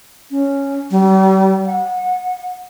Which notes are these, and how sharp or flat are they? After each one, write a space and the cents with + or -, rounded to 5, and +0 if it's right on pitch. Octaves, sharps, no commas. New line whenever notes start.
C#4 +0
G3 -45
F#5 -25